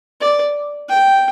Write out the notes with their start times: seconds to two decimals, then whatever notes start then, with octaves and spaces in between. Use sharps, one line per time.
0.21 D5
0.89 G5